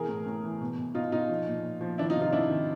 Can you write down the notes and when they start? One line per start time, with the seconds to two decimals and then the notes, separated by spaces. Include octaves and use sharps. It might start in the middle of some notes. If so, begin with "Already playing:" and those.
Already playing: B2 E3 G#4 A#4
0.09 A2
0.26 A2
0.44 E3
0.61 B2
0.78 B2
0.95 B2 D#4 F4
1.12 B2 D#4 F4
1.29 F3
1.46 A#2
1.64 A#2
1.81 F3
1.98 D#3 D4 E4
2.10 D#4 F4
2.16 C3
2.21 D#4 F4
2.33 C3 D4 E4
2.50 D#3